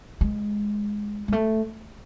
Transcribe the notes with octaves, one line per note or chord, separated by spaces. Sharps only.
G#3
G#3
A3